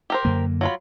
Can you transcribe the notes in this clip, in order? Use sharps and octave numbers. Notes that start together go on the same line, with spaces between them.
G4 A#4 C5
F#2 D3 A#3
F#3 F4 B5